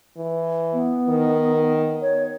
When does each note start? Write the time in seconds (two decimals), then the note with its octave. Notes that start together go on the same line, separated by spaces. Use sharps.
0.17 E3
0.73 B3
1.09 D#3
2.02 C#5